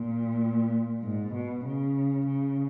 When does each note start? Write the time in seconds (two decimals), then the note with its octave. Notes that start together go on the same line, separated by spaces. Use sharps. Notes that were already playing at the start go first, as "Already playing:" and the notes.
Already playing: A#2
1.02 G#2
1.34 B2
1.65 C#3
2.27 C#3